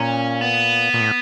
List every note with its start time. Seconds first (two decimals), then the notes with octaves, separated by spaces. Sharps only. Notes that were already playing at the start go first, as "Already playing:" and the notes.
Already playing: A#2 C#4
0.41 B3
0.94 A#2
1.01 A2